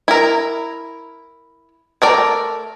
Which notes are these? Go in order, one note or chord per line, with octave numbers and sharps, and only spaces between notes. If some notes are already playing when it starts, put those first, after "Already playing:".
E4 A#4
A3 A#4 D5